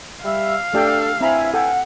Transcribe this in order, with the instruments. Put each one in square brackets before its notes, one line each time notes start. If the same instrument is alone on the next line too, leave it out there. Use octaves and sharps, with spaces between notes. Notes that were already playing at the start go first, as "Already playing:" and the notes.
[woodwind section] G3 E5 [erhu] F5
[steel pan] A3 G4 G5 [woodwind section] D4 A4
[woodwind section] G2 E4 G#5 [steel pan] C4 A#5 B5 [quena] E5
[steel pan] A4 G5 [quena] F#5